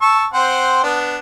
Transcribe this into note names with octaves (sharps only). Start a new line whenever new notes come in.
A5 C#6 E6
C4 C5 F#5
B3 D4